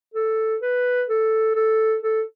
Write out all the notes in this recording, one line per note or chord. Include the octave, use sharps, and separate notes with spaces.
A4
B4
A4
A4
A4